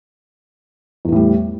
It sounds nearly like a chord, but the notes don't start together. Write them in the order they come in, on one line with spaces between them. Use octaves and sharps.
E2 E3 A2 G3